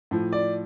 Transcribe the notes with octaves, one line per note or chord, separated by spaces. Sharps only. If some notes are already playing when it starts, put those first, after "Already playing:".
A2 F3
D5